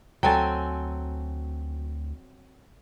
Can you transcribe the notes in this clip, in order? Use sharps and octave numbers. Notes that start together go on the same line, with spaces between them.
D2 F#3 C4 A4 G5 G#5